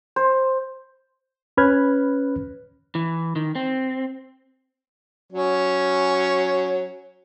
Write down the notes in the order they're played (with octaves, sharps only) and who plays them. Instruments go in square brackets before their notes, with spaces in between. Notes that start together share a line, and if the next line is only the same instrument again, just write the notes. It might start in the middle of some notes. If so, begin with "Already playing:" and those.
[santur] C5
[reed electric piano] C#4 B4 B5 F6 F#6 G#6
[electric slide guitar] E3
D#3
C4
[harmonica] F#3 C#4